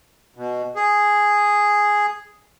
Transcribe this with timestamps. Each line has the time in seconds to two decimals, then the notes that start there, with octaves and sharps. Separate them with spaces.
0.36 B2
0.76 G#4